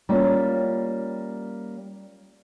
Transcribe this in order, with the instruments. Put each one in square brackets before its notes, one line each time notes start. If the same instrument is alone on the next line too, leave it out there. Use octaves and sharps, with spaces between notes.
[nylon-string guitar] G3 A#3 C#4 E4 F4